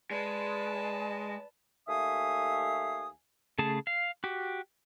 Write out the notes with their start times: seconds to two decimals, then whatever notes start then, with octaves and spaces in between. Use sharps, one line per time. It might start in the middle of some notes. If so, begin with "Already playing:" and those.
0.11 G#3 B4 D5 A5
1.87 D#2 A3 E5 F5 G#5 D#6
3.59 C#3 A3 G#4 A5
3.87 F5
4.24 F#4 G4